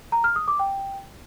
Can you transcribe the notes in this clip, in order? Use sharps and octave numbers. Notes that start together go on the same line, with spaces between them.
A#5
F6
D#6
D6
G5